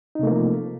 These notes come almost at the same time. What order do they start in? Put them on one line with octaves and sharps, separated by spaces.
D#4 C3 A3 A#3 F3